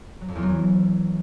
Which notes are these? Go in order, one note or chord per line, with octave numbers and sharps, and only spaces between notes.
F#3
F2
E2
F#3
E3